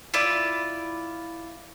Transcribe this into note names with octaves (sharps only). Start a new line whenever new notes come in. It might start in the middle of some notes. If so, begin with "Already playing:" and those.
E4 F4 D5